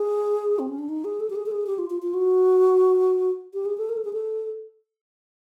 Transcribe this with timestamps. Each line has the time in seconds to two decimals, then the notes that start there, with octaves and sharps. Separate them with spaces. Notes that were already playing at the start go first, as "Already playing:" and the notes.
Already playing: G#4
0.59 C4
0.69 C#4
0.79 D4
0.89 D#4
1.04 G#4
1.20 A4
1.30 G4
1.36 G#4
1.46 A4
1.51 G#4
1.67 G4
1.78 F4
1.90 F4
2.02 F4
2.14 F#4
3.54 G4
3.65 G#4
3.78 A4
3.89 A#4
3.97 A4
4.05 G#4
4.13 A4